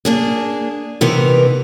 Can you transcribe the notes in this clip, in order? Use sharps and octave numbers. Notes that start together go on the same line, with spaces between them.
A#3 D4 G#4
C3 E3 B3 D#4 A#4